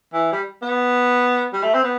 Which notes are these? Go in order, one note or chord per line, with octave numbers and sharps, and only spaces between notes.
E3
G3
B3
G3
A3
C4
B3